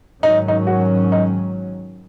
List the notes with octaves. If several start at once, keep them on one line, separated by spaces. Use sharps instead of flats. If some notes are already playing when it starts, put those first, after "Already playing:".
G#2 D#3 F#3 C#4 D#4
D#4
F#4
D#4